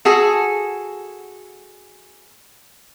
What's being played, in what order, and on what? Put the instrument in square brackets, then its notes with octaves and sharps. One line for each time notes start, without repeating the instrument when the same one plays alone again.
[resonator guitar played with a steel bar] F#4 G#4 A4